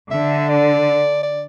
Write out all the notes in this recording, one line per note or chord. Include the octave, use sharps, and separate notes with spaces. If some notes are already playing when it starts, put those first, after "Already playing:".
D3 E5
D5
D5